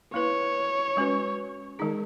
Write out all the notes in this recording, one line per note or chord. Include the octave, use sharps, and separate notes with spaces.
A#3 E4 B4 C#5
G#3 C#4 F#4 B4
D#3 G#3 D#4 G#4